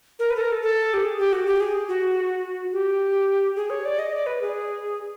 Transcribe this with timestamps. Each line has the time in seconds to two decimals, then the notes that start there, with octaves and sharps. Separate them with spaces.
0.19 A#4
0.30 B4
0.36 A4
0.41 A#4
0.52 A4
0.62 A4
0.94 G4
1.03 G#4
1.18 G4
1.33 F#4
1.46 G4
1.60 G#4
1.89 F#4
2.72 G4
3.56 G#4
3.70 C#5
3.85 D5
3.99 D#5
4.13 D5
4.26 B4
4.41 G#4